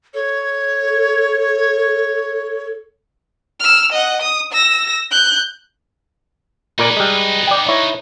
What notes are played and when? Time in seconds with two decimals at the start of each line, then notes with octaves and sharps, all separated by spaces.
0.14 A4 C#5
3.60 E6 F6
3.92 D#5 F#5
4.22 D#6
4.53 E6 A#6
5.11 F#6 G6
6.79 A#2 D#4 A#4 B4 D5
6.97 G3 G#3
7.47 D5 G5
7.68 E4 C#5